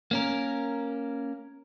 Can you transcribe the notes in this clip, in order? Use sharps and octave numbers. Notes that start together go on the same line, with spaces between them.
A#3 C#4 A#4